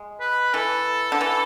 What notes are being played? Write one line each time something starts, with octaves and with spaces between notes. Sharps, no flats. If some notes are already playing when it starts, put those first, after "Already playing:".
Already playing: G#3
B4
E3 A4
D3
E3